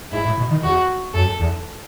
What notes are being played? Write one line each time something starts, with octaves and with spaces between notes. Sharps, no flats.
G#2 E4
A2
B2
D#3
E2 F#4
F#2 A4
E2